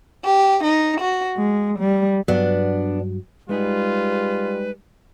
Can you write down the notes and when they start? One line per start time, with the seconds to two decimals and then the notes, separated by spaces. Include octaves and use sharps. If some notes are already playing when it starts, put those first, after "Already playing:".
0.24 G4
0.62 D#4
1.00 F#4
1.37 G#3
1.80 G3
2.28 G2 F#3 B3 D4
3.49 G3 G#3 D#4 F4 G#4 B4